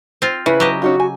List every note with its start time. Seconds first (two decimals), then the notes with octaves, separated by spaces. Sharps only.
0.22 C4 F4
0.46 C#3 E4 B4
0.60 F#3 G4 D#5
0.82 C#4 D#4 F4 F#4
1.00 G#5